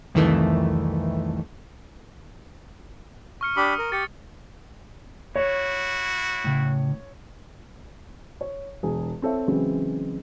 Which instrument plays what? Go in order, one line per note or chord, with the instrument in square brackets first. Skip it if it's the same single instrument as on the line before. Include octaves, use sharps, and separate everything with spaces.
[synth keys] C2 F2 D#3 E3 A3
[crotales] C#6 F6 C#7
[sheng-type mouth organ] D4 G4 B5 [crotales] D#6
[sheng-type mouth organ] A#4
[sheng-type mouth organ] G4 [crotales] A6 C#7
[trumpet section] E4 F#4 [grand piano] C#5
[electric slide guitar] A2 C#3
[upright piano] C#5
E1 G#4
C4 A4 C#5 E5
C#3 E3 F#3 G#3 C4 C#4